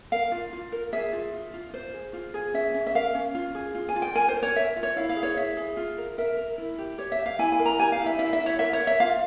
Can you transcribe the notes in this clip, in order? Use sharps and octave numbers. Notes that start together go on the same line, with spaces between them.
A#4 F5
F4
F4
A#4
G#4 E5
F4
F4
F4
F4 C5
G#4
F4
G#4
C#4 E5
C#4
E5
A#4 F5
C#4
F4
G#4
F4
G#5
F4
G5
A#4 G#5
C5
A#4
C#5
A#4 E5
F4
C#5
E4 F5
F5
G#4
C#5
E4 E5
G#4
F4
A#4
A#4 E5
A#4
E4
G4
G4 C#5
E5
G4
F5
E4 G#5
G#5
A#4
A#5
G4 G#5
F5
E4
E5
E4 E5
E5
E4
C#5
A#4 E5
C#5
A#4
E5
F4 F5